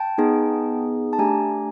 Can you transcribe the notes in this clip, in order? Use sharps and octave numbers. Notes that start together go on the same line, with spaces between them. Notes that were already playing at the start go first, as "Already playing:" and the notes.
Already playing: G5 A5
B3 D#4 G#4
A5
A3 D4 G4 G#5 A#5